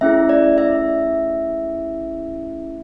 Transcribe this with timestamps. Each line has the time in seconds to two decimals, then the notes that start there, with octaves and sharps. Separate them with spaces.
0.01 A3 C#4 E4 G#4 E5
0.29 D5
0.58 E5